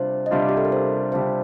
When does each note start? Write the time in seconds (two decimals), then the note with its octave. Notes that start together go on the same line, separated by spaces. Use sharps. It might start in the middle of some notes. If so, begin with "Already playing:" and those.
Already playing: C3 G3 D4 F4 C5
0.26 D#5
0.31 C3 G3 D4 F4 D5
0.49 G4
0.57 A4
0.65 A#4
0.72 C5
1.12 C3 G3 D4 F4 C5